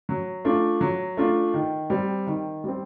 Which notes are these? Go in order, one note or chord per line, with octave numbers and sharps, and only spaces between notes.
F#3
A3 D4 F4
F#3
A3 D4 F4
D#3
G3 C4
D#3
G3 C4